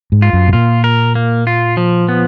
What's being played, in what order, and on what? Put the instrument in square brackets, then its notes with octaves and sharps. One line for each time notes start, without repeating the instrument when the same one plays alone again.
[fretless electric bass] G#2
[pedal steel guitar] F4
[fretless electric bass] F#2
B2
[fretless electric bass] A#2 [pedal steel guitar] F4
[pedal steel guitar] A#4
A#3
F4
F3
B3